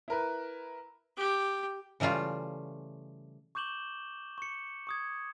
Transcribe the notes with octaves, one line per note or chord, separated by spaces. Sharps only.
E4 A#4 B4
G4
C#3 E3 G3 A3 F4
C#6 D6 G6 E7 F#7 G7
C#6 C#7
C#6 D#6 G#6